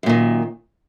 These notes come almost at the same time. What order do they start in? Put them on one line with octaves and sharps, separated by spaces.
F#2 A#2 D#3